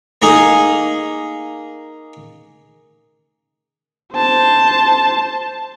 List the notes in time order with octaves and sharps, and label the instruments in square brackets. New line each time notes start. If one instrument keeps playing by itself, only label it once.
[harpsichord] A#3 D#4 G#4
[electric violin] C5 A5